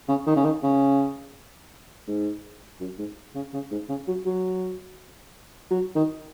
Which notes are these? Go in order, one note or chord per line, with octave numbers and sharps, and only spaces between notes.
C#3
D#3
C#3
D#3
C#3
G#2
F#2
G#2
C#3
C#3
G#2
C#3
F#3
F#3
F#3
D#3